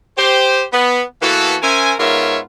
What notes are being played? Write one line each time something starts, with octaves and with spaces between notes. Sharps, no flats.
G4 C5
B3
E3 A#3 B3 F#4 A4
C#4 A#4 C5 E5 G#5
G#2 B3 F4 A#4 C#5 E5